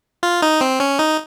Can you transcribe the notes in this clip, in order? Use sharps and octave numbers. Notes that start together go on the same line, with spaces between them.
F4
D#4
C4
C#4
D#4